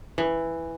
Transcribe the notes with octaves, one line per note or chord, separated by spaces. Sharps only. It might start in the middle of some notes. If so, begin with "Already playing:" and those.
E3